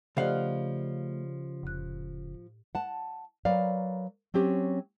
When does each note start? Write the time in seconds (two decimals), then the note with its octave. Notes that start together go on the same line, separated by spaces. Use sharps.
0.17 C#3 F3 A3 G4 D5 D#5 F5 F#5
1.63 F1 A2 F#6
2.75 F#5 A5
3.45 F#3 A#4 B4 D5 F5
4.34 F#3 C4 C#4 G4